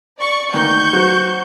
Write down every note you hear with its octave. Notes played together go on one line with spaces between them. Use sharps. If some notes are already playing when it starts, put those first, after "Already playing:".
D5 C#6
D2 D#3 A#3 C#6 G6
F#3 F#4 C5